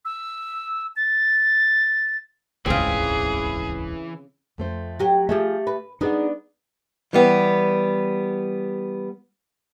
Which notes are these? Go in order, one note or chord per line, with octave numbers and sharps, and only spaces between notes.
E6
A6
D#1 G#1 C#2 C#3 E3 C4 G#4
F2 A3 C5
F#3 G4 F#5
F3 A3 G4 G#4 E5
B4
B3 D4 D#4 G#4 F#5
E3 G3 B3